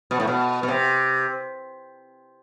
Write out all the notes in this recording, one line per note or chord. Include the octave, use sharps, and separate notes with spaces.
B2
A2
B2
B2
C3